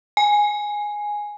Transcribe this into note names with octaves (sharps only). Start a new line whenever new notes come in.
G#5